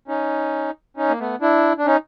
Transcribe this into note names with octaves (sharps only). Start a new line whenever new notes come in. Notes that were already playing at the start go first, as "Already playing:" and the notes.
C#4 D#4
C#4 D#4
A#3
A3 B3
D4 E4
D4
C#4 D#4